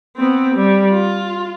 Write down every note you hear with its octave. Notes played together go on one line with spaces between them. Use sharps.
B3 C4
G3
F4